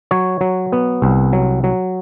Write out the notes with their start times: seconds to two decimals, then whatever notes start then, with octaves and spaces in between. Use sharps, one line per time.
0.11 F#3 C#5
0.41 F#3
0.72 B3
1.02 C2
1.33 F#3
1.64 F#3